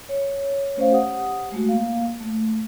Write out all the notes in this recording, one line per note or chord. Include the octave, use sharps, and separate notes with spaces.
C#5
A3 C#4 C5 D5 F5
G4 F#5 D#6
G#3 A3 F#4
A#3 F5
A3